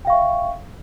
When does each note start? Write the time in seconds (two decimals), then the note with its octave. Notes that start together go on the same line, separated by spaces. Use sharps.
0.05 G5
0.07 F5
0.10 C#6
0.12 E5